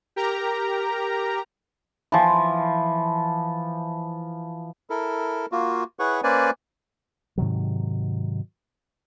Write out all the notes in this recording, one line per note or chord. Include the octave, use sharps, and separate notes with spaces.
G4 A#4 A#5
E3 F3
E4 A4 A#4
A#3 F4 F#4
E4 G#4 B4 C#5 F#5 C#6
A#3 C#4 B4 C5 D5 G#5
G#2 C3 D#3 F#3